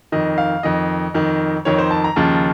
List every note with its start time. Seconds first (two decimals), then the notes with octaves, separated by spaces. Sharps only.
0.12 F2 D#3 D#5
0.38 F5
0.63 F2 D#3 D#5
1.14 F2 D#3
1.65 F2 D#3 C#5
1.78 C5
1.90 A5
2.04 A#5
2.16 D#2 C#3 F3 A5